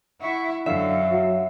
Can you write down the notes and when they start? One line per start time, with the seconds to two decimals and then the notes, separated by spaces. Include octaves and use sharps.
0.21 E4 E5 F#5 C#6
0.66 F#2 D3 E5 F5
1.12 F#3